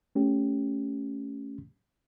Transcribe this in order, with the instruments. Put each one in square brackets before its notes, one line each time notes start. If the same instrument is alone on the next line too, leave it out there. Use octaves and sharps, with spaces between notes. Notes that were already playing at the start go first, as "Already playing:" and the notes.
[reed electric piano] A3 C#4 G4